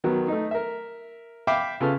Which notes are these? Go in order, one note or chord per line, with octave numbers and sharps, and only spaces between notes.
D#3 F#3 B3
A3 D#4
A#4 E5
E5 F5 G5 B5 D6
C#3 F4 A4 B4 A5 F6